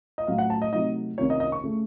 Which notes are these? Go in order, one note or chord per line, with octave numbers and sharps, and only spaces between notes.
D#5
A2 F#3 A3 C#4 F5
F#5
A5
D#5
C3 F#3 A3 D#4 D#5
C2 C3 D#3 A#3 C#4 C#5
D#5
D#5
C#6
C#3 A3